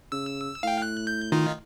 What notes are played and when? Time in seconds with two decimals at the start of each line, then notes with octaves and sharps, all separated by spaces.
0.12 C#3 E6
0.63 A2 F5 G5
0.82 F#6
1.07 G6
1.32 D#3 D#4 F4